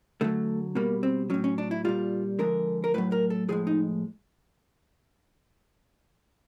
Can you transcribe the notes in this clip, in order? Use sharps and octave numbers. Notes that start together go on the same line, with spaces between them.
D3 F#3 A3
B2 G3 A#3
C4
A2 F#3 C#4
C#4
D4
E4
A#2 G3 F4
D3 F3 G#3 A#4
A#4
A2 F#3 B4
A#4
A4
A2 F3 G#3 G#4
D#4